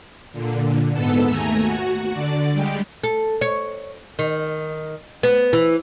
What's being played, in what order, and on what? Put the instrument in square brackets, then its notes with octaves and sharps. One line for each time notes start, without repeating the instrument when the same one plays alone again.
[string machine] A#2 D3
G#2 B3 A4 E6
D#2 A3 G#5 A#5
F#4
D3 D5
G3 G#3 G4
[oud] A4
C#5
D#3
B3
E3